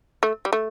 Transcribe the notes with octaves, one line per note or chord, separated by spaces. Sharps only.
A3
G3
A3